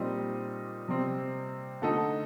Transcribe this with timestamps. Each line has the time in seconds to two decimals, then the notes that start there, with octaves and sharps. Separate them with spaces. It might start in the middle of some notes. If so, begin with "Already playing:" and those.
Already playing: A#2 G3 C4 D#4 D#5
0.88 C3 G3 C4
1.82 D3 A3 D#4 A4